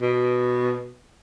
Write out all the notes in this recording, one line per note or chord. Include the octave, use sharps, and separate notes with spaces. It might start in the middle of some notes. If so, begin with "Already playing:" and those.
B2